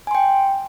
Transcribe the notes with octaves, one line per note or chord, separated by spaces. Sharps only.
G5 G#5 C6